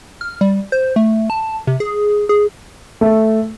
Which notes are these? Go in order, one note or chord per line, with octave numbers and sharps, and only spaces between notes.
F6
G3
C5
A3
A5
C3
G#4
G#4
A3